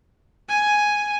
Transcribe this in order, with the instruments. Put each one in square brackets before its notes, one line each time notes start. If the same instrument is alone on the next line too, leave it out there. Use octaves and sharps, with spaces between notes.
[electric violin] G#5